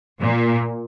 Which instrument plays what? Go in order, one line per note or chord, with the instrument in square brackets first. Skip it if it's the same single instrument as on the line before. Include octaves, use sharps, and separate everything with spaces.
[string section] A#2